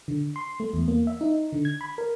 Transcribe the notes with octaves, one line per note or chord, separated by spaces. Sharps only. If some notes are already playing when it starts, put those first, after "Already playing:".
D3
C6
A3
E2
A#3
E5
D#4
D3
G#6
B5
A#4